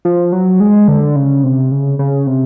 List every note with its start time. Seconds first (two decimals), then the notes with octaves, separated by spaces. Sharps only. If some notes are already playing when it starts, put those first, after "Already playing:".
0.05 F3
0.32 F#3
0.60 G#3
0.88 D3
1.16 C#3
1.44 C3
1.71 C#3
1.99 C#3
2.27 C3